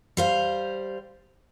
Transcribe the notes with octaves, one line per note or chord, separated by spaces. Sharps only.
G3 C5 F5